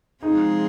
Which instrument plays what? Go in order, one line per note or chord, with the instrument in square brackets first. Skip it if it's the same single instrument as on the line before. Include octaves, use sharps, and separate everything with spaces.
[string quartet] C3 F3 G#3 F4 G#4 [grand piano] D#4